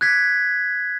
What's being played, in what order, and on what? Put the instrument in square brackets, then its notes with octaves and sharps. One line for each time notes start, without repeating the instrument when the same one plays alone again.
[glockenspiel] F#6 G#6 B6